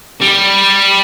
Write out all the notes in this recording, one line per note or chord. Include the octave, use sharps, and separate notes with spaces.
G3